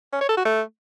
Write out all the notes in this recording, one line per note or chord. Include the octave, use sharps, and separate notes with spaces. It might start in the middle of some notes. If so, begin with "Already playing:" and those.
C#4
C#5
A4
F#4
A3